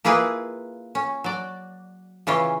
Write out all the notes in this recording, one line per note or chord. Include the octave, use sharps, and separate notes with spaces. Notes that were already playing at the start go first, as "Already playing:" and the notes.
A#3 E4 F4 G#4 B4
C#4
F#3 D5
C#3 E3 C#4 F4